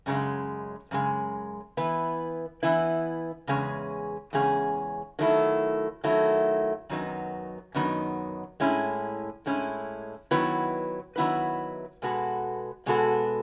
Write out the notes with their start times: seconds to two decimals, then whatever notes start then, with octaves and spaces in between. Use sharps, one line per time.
0.06 F#2 C#3 G#3
0.91 F#2 C#3 G#3
1.77 E3 B3 E4 B4
2.63 E3 B3 E4 B4
3.47 E2 C#3 G#3 C#4 G#4
4.33 E2 C#3 G#3 C#4 G#4
5.19 D#3 F#3 A3 E4
6.04 D#3 F#3 A3 E4
6.89 F#2 D#3 F#3 B3 D#4
7.74 F#2 D#3 F#3 B3 D#4
8.60 A2 G#3 C#4 E4
9.46 A2 G#3 C#4 E4
10.31 D#3 F#3 B3 E4 B4
11.16 D#3 F#3 B3 E4 B4
12.02 B2 G#3 B3 F#4 A4
12.86 B2 G#3 B3 F#4 A4